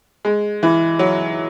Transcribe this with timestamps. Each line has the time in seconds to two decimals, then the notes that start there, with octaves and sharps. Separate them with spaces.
0.25 G#3
0.63 E3
0.99 F#3